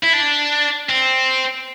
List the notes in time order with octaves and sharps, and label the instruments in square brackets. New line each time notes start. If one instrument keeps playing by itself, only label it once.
[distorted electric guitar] E4
D4
C4